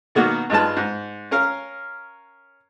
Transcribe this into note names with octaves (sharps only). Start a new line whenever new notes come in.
B2 D#3 A#3 B3 F#4
G2 G#3 D#4 F4 B4 A5
G#2
C#4 A#4 F5